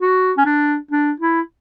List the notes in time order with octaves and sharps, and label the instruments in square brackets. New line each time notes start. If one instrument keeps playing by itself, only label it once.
[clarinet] F#4
C#4
D4
D4
E4